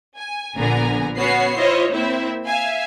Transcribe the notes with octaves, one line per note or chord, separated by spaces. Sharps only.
G#5
A#1 D3 B3 A#4 G#5 A#5
B3 C#4 F#4 B4 C#5 C7
E4 F4 C5 C#5 D#5
A#3 C4 E4 E5
E5 F5 G#5